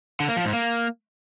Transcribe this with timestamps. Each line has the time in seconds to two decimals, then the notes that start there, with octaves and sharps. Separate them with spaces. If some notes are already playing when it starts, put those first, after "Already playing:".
0.20 D3
0.28 A#3
0.37 F3
0.45 G#2
0.53 A#3